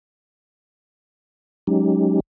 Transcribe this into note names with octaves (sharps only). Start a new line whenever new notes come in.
F#3 G#3 C#4 D#4 G4